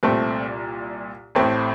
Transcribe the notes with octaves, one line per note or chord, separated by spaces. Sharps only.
C2 A#2 A3 C4
A1 A2 A3 C4